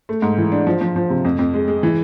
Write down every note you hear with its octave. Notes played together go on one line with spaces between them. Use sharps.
A3
G#2
E3
D4
F3
F3
F3
C3
F2
F2
G#3
G#3
E3